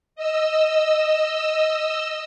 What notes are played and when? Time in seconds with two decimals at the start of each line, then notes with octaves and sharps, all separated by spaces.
0.16 D#5 E6